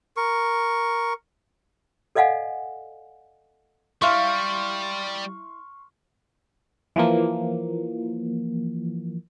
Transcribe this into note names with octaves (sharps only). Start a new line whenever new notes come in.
A#4 C#6
A4 D5 D#5 F5 F#5 G#5
G3 E4 E5 F5 C6 C#6 F6
E3 F3 A#3